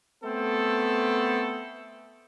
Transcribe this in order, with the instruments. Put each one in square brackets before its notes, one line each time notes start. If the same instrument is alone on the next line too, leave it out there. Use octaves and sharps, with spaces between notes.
[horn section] A3 B3 C4 A4